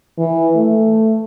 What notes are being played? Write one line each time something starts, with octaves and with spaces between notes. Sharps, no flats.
E3
A3